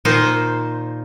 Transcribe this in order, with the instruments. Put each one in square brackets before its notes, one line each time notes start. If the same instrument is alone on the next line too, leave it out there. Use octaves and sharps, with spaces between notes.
[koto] A#2 D#3 A#3 D#4 C5